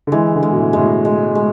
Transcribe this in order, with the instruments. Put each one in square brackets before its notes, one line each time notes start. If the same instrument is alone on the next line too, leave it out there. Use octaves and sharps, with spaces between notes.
[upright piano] D3
[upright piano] E3 [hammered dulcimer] G#3
[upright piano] D3
[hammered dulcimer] G#3
[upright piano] B2
A2
[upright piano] A2 [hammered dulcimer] G#3
[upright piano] B2
[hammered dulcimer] G#3
G#3